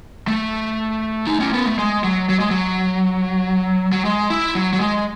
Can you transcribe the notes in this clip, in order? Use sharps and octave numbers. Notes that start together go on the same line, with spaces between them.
A3
D#4
C#4
B3
A3
G#3
F#3
F#3
G#3
F#3
F#3
G#3
E4
F#3
F#3
G#3